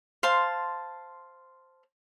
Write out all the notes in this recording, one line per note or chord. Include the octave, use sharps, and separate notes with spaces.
C5 F5 A5 C6